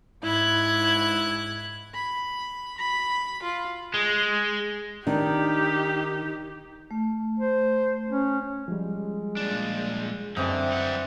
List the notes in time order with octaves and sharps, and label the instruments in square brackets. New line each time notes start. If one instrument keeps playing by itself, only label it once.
[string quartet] G#2 E4 F#6 G#6
[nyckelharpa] B5
B5
F4
[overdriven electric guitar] G#3
[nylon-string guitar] D#3 D4 [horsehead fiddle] D#4 G4
[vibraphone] A3
[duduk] C5
C#4
[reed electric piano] F3 G3 [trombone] G#3
[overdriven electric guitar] A#2 D4
[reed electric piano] F#2 [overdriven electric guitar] D3 [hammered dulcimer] E3 D#4 [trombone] C4
[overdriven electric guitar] G3 F#5